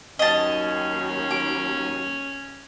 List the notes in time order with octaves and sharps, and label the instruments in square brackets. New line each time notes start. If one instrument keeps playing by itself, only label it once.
[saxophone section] D#2 F#3 [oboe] C#4 [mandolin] D#5 A5
[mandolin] D6